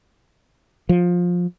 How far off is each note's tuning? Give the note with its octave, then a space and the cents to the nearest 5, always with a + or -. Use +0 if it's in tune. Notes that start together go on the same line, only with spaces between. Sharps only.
F3 +15